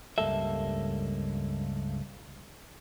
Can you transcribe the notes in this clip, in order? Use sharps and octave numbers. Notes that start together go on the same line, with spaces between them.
C#2 G2 G3 A#3 A4 E5